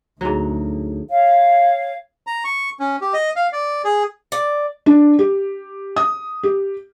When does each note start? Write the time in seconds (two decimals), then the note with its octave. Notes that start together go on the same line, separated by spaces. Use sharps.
0.21 D2 G#2 F#3
1.09 C#5 F5
2.27 A#5
2.44 C#6
2.80 C#4
3.01 G4
3.13 D#5
3.36 F5
3.53 D5
3.84 G#4
4.32 D5
4.86 D4
5.19 G4
5.96 D#6
6.43 G4